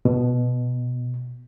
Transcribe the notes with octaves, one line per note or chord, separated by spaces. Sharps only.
B2